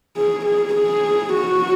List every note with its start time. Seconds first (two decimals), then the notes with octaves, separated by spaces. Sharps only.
0.17 G#4
0.46 G#4
0.75 G#4
1.33 F#4